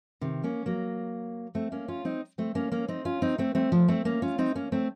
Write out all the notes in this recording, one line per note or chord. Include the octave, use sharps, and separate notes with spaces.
C3 D#3
A#3 C#4
F#3 A#3
A3 C4
A#3 C#4
C#4 F4
C4 D#4
A3 C4
A#3 C#4
A#3 C#4
C4 D#4
C#4 F4
C4 D#4
A3 C4
A3 C4
F3 A3
A3 C4
A#3 C#4
C#4 F4
C4 D#4
A#3 C#4
A3 C4